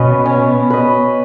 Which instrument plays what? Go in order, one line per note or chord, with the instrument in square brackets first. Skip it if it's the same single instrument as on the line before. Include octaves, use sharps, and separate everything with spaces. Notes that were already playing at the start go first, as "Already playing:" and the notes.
Already playing: [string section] B2 [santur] C#4 B4 D#5
[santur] C#4
B4 D#5